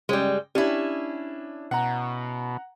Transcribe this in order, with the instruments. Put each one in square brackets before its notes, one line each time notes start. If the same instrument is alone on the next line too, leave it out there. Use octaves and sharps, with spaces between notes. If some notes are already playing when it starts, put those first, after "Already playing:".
[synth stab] G1 C#3 G5 [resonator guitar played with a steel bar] G3 G#3
[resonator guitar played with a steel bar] C#4 E4 [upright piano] D4 [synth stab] G4
[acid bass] B2 [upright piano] F#5 A#5